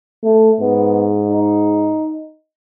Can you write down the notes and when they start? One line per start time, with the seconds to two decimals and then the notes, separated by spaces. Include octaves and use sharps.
0.24 A3
0.60 G#2 B3
1.29 D#4